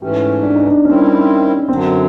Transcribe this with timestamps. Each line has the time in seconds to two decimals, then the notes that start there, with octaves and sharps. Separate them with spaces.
0.02 G#2 E3 A3 C#4 G4
0.43 D4
0.55 D#4
0.66 D4
0.85 D#3 G3 C4 C#4 E4
1.68 F#2 D3 F#3 C4